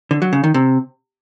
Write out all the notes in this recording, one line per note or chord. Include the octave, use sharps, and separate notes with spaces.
D3
F#3
C#3
D#3
C3